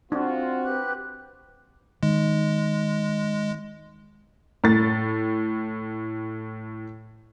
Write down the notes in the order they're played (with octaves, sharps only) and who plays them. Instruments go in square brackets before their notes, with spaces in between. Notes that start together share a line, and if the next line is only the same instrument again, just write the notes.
[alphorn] C4 [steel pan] D4 [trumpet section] F4 F#4
[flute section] G4 B4 F#6
[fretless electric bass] D#3 [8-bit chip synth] G#3
[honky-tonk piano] A2 A6